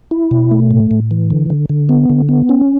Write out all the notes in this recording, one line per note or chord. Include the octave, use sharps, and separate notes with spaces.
E4
B2
A3
A2
A2
E3
D3
D3
D3
B3
D3
B3
C#4